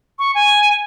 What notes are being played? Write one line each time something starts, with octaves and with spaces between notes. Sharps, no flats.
C#6
G#5